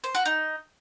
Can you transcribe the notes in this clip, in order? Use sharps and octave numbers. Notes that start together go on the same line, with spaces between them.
C5
F#4
D#4